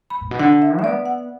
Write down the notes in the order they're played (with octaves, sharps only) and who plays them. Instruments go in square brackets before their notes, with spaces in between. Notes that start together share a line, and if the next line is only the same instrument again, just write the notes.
[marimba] B5
[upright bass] A2
B2
[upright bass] D3 [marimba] F#5
[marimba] E5
E5
[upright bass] B3 [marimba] D5
[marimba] F#5